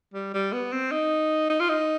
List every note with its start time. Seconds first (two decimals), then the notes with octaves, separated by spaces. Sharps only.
0.14 G3
0.34 G3
0.52 B3
0.72 C4
0.92 D#4
1.50 D#4
1.60 F4
1.69 D#4